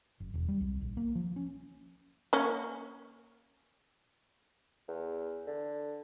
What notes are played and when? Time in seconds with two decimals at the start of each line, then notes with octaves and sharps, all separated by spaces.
0.20 F#1
0.34 E1
0.48 G3
0.61 C2
0.81 A#1
0.97 A#3
1.15 F3
1.36 C#4
2.33 A#3 C#4
4.88 E2
5.47 D3